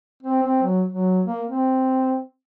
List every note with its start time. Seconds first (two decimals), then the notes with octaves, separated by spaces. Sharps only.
0.23 C4
0.42 C4
0.63 F#3
0.88 F#3
1.26 A#3
1.47 C4